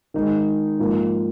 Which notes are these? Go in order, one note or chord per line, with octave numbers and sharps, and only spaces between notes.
D#3 G#3 D#4
G#2 F3 A#3 F4